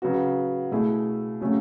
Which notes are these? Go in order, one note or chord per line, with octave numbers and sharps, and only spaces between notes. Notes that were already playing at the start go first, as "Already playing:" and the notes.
C#3 F#3 B3 F#4
B2 A3 E4 G#4
C#3 F#3 A3 C#4